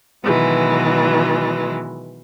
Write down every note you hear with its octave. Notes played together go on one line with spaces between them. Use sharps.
B2 D#3 E3 F#3 G#3